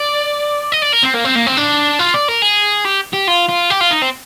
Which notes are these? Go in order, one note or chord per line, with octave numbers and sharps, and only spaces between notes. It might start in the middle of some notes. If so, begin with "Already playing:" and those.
Already playing: D5
D#5
D5
A#4
C4
A#3
C4
A#3
C4
D4
F4
D5
A#4
G#4
G4
G4
F4
F4
G4
F4
D#4
C4